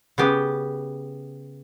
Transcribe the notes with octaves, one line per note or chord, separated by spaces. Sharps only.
C#3 B3 G4